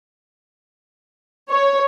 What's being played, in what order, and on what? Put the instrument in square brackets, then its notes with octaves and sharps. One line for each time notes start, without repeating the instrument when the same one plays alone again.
[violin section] C#5